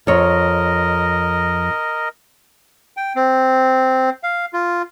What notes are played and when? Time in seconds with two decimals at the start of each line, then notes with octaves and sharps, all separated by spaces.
0.07 F2 A#4 C#5 D#5
2.97 G5
3.16 C4
4.23 F5
4.53 F4